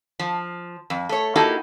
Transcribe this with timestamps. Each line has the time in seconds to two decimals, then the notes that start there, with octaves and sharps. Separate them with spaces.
0.19 F3
0.90 F2
1.09 A3 C#5
1.35 A#3 D#4 E4 F#4 G4 A4